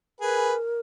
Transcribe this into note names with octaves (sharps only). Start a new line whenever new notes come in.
G#4 A#4 B4